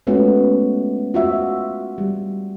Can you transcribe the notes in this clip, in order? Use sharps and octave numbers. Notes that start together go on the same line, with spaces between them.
G#3 A3 B3 C#4 F4 F#4
F4 F#4 E5
G3